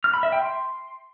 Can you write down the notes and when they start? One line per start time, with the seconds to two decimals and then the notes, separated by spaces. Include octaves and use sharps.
0.04 F6
0.14 B5
0.23 E5
0.32 G5
0.42 C6